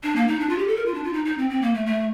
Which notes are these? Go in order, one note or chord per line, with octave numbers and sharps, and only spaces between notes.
D4
A#3
D#4
D4
F4
G4
A4
A#4
F4
D4
F4
D#4
D#4
C4
C4
A#3
A3
A3